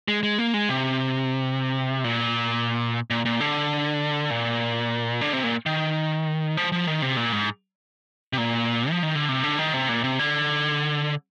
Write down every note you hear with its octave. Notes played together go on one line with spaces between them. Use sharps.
G#3
G#3
A#3
G#3
C3
A#2
A#2
A#2
D3
A#2
D3
C3
A#2
D#3
F3
F3
D#3
C3
A#2
G#2
C3
A#2
F3
D#3
D3
C3
D3
D#3
C3
A#2
C3
D3